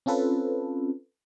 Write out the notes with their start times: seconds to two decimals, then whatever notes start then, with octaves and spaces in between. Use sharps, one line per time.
0.06 C4 C#4 F4 A4 B4